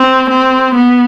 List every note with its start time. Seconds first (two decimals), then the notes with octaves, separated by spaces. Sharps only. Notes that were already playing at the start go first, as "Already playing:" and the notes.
Already playing: C4
0.30 C4
0.75 B3